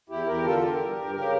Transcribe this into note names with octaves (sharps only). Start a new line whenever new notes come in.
E2 E4 G4
E2 G4 A#4
D3 F4 A4
D3 G4 A#4
G2
G2
C#3 G4 A#4